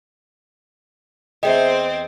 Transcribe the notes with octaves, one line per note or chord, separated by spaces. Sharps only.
E2 C4 G#4 C5 D#5 E5 G5